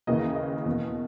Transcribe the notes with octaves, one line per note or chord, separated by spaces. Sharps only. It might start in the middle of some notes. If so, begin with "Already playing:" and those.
D#2 C#3 E3 A#3 D#5
D#5
E2 B2 A#3